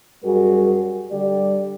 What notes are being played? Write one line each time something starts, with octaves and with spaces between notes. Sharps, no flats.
F#2 G3 F#4 G#4 A#4
D3 G3 G4 D5